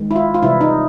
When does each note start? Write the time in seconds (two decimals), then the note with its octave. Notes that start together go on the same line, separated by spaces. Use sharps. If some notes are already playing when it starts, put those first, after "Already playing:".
Already playing: D#3 G#3
0.11 E4
0.16 F4
0.34 F4
0.43 C3 E3 G3 E4
0.61 D#4